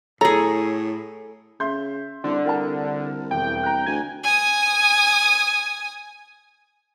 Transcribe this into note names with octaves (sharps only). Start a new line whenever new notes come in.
A2 G#4 A4 C#5 A#5
C#3 E5 C6 G6
C2 D3
C2 A#4 F#5 A5
E1 G5
A#5 F#6
D2 G#5
G#5 D#6